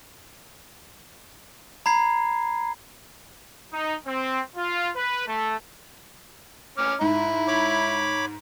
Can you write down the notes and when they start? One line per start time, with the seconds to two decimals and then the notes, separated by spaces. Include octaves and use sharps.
1.86 A#5 B5 G#6 C7
3.73 D#4
4.05 C4
4.56 F4
4.95 B4
5.26 A3
6.78 C#4 D6 F6
7.01 G#2 E4
7.48 C#5 B5 D6